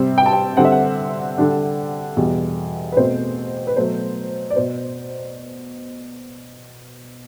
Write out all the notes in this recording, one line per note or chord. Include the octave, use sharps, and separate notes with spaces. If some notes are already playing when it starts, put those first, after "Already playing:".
Already playing: C3 G3 C4
G5
A5
G5
D3 G3 C4 F#5
E5
F#5
D3 G3 D4
E2 B2 G3
B4
B2 A3 C4 C5
B4
B2 F#3 A3 C5
D5
B2 C5